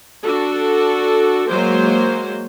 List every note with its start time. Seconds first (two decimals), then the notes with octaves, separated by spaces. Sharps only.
0.24 D4 F#4 A4
1.49 F#3 G#3 A#3 C5